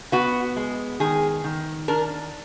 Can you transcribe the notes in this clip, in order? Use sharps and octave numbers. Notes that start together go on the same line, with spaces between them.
B3 F#4
G#3
D#3 G#4
D#3
D4 A#4